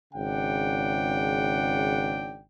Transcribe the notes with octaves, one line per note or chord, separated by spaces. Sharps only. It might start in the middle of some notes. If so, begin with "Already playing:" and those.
G#1 C#3 D4 F#5 G5